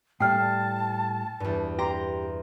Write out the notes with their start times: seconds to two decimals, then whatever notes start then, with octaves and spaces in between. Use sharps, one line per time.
0.20 A2 G3 A3 G5 A5 F6 C7
1.40 E2 G2
1.79 G4 A#5 C6 A#6